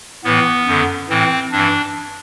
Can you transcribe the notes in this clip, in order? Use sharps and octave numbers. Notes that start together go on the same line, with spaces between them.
A2 E3 B3
F#2 D3
A2 E3 C4
G2 E3 D4